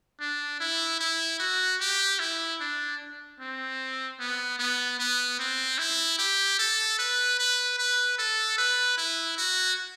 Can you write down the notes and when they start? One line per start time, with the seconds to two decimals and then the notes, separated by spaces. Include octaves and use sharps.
0.20 D4
0.60 E4
1.00 E4
1.40 F#4
1.81 G4
2.19 E4
2.60 D4
3.40 C4
4.19 B3
4.59 B3
4.99 B3
5.39 C4
5.78 E4
6.19 G4
6.59 A4
6.99 B4
7.39 B4
7.78 B4
8.18 A4
8.58 B4
8.97 E4
9.38 F#4